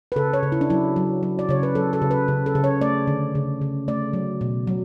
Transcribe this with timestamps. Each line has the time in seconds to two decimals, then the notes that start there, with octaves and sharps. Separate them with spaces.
0.12 B4
0.16 C#3 A4
0.33 C#5
0.43 C#3
0.52 E4
0.61 D4
0.70 F#3 E4
0.96 F#3
1.23 F#3
1.39 D5
1.49 C#3 C#5
1.63 B4
1.75 F#3 A4
1.93 A4
2.02 C#3
2.11 B4
2.28 C#3
2.46 A4
2.55 C#3
2.64 C#5
2.81 A3 D5
3.07 D3
3.35 C#3
3.62 C#3
3.88 A3 D5
4.13 F#3
4.41 B2
4.67 F#3